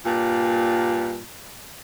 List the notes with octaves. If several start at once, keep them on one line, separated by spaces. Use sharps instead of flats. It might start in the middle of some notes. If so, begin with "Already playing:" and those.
G2 A#2